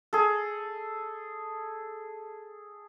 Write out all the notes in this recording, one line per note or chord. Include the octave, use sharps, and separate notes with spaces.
G#4 A4